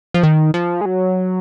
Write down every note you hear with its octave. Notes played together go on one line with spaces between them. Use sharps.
F3
D#3
F3
G#3
F#3